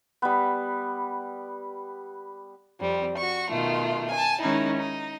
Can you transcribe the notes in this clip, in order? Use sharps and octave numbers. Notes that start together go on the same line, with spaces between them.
G3 B3
F2 G3 C4
F#4 C#6
B2 D#3 A3 F4
G#5 A5
D#3 G#3 C#4 D#4 E4
D#4